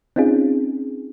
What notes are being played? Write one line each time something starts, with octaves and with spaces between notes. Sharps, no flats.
C4 C#4 D#4 F4 G#4